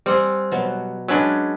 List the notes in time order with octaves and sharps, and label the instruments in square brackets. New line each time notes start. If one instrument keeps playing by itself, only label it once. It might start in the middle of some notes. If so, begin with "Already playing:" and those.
[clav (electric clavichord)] G3 [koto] C4 F#5 G#5
[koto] B2 F#3
[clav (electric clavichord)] F#3 D4 [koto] G#3 C#4 B4